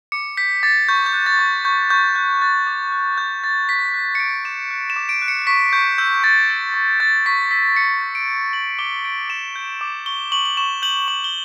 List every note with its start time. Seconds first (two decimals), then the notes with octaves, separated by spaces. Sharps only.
0.12 D6 C#7
0.37 G6 B6
0.63 D6 A6
0.88 C#6 G6
1.06 G6
1.13 F#6
1.26 A6
1.39 C#6
1.65 C#6 G6
1.90 C#6 G6
2.16 F#6 G6
2.42 F#6 A6
2.67 D6
2.92 F#6
3.18 D6 G6
3.43 D6 A6
3.69 D6 B6
3.94 F#6
4.15 C#7
4.20 D6 D7
4.45 D6 E7
4.71 F#6
4.90 E7
4.96 D6
5.09 D7
5.22 F#6
5.28 C#7
5.47 C#6 B6
5.73 C#6 G6
5.98 E6 G6
6.24 C#6 A6
6.50 E6
6.74 C#6
7.00 G6 A6
7.26 C#6 B6
7.51 E6 B6
7.76 G6 C#7
8.02 G6
8.15 D7
8.28 G6
8.53 G6 F#7
8.79 D6 G7
9.05 G6 D7
9.30 D6 E7
9.56 G6
9.81 D6
10.06 C#6 G7
10.32 C#6 F#7
10.46 F#7
10.57 C#6 E7
10.82 G6 F#7
11.08 C#6 F#7
11.24 G7